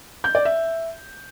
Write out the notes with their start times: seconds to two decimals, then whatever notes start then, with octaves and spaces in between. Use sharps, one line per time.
0.24 G6
0.35 D5
0.45 E5